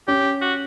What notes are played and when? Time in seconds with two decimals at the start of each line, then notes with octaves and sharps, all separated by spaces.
0.07 C#4 G4
0.41 F#4